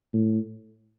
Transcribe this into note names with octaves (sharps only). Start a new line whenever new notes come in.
A2